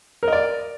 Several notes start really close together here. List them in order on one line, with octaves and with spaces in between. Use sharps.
A#4 D#5 D5